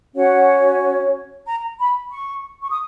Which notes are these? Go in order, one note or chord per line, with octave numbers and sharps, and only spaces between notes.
C#4 F#4 C#5 F#5
A#5
B5
C#6
C#6
D#6